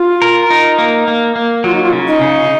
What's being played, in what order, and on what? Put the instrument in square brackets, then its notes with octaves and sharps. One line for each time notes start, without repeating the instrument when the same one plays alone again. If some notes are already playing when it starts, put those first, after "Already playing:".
Already playing: [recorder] F4
[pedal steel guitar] A#4
D#4
A#3
A#3
A#3
[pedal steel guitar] F#3 [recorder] F4
[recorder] D#4
F4
[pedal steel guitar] C#3
[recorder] D#4
[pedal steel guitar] C#3